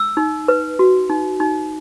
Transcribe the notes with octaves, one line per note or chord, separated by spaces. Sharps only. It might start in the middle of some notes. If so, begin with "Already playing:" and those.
Already playing: E6
D#4
B4
F#4
D#4
D#4